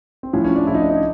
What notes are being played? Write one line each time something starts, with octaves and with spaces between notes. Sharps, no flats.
C4
A2 F3 C#4
C#4
D4
A2 F3 E4
D#4
D4
D#4